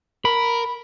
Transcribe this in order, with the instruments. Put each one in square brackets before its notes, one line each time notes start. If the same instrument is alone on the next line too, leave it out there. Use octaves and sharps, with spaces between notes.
[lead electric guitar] A#4 [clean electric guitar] B5